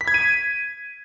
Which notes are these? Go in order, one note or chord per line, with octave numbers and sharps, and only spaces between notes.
B6
G#6
D#7